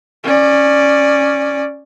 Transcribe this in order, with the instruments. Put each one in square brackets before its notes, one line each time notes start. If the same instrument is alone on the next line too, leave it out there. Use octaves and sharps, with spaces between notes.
[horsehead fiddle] C#4 D5